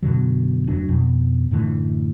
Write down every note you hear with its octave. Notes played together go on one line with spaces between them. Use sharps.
F#2 B2 D3 F#3
F1 F#3 D4
F2 B2
F#2 A2 D3 E3